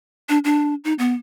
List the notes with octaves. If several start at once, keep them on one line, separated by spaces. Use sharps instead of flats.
D4
D4
D#4
B3